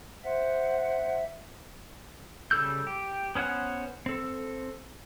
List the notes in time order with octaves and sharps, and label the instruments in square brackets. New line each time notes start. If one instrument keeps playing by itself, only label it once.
[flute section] C5 F#5 [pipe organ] E5
[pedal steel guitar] C#3 G3 A4 E6 G6
G4
B3 C#4 C5 F#5 F#6
C4 A4